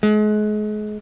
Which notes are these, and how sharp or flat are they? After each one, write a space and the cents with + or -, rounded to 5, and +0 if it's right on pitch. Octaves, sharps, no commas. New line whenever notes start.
G#3 +35